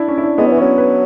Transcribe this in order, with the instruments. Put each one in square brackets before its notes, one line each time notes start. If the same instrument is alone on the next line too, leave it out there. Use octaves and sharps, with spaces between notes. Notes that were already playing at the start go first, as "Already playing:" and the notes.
Already playing: [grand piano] D4 E4
C#4
E4
D4
[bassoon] G#3 [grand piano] B3
[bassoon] F#3
E3
[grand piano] C#4
[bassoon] F#3
[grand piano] B4